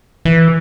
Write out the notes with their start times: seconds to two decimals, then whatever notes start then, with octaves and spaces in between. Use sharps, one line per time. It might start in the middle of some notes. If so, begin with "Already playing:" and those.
0.25 E3